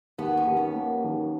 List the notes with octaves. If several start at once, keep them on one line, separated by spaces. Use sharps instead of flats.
D#2 B3
C#4
D#2
B3
A#3
D#3